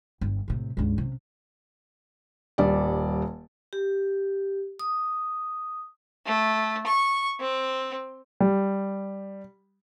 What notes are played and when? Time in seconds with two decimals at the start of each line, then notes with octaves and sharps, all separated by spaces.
0.21 G1
0.48 A2 C3
0.77 C#2 G2
0.98 C3 C#4
2.58 D#1 G3 D5
3.73 G4
4.79 D#6
6.26 A3
6.87 C#6
7.40 C4
8.40 G3